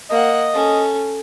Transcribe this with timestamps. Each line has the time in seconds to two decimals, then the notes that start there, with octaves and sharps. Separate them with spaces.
0.10 A#3 D#5 F#5
0.53 C#4 A4